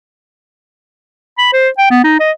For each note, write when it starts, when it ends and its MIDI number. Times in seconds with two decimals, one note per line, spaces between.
1.38 1.51 83
1.53 1.69 72
1.78 1.87 79
1.91 2.02 59
2.04 2.20 63
2.20 2.31 75